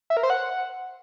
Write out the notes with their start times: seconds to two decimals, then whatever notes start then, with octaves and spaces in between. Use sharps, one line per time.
0.10 E5
0.17 A#4
0.23 C5
0.30 F#5